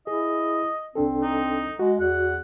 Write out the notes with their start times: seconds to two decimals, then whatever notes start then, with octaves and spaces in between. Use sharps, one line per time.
0.07 E4 G#4 D#5
0.95 C2 C4 D4 A4
1.22 D#4
1.79 G#3 F#4
2.00 E2 F#5